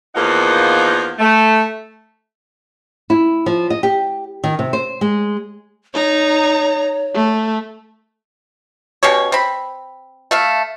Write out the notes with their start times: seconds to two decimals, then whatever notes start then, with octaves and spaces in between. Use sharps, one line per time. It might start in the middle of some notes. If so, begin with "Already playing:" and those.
0.15 E2 F3 A#3 D#4 A#4 F#5
1.19 A3
3.10 E4
3.46 F3
3.70 D#5
3.83 G4
4.44 D#3
4.59 C3
4.73 C5
5.01 G#3
5.94 D#4 C#5 A#5
7.15 A3
9.03 B2 C#4 G4 C#5
9.32 C4 B5
10.31 A3 E5 F5